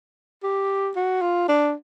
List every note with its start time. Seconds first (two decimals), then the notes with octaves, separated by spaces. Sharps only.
0.43 G4
0.96 F#4
1.22 F4
1.48 D4